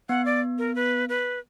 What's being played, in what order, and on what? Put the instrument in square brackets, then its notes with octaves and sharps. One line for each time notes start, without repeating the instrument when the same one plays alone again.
[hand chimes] B3 [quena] F#5
[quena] D5
A#4
B4
B4